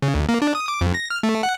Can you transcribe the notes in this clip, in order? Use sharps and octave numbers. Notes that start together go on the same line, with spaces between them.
C#3
D2
A#3
D4
D#6
D6
F2
A#6
F6
A3
F#5